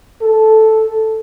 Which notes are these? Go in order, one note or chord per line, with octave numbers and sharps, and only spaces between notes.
A4